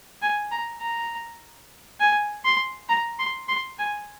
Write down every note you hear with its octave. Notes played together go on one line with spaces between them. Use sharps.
G#5
A#5
A#5
G#5
C6
A#5
C6
C6
G#5